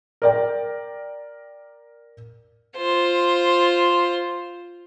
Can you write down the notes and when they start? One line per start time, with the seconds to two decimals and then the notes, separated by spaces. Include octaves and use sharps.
0.22 A#4 D5 G5
2.77 F4 C5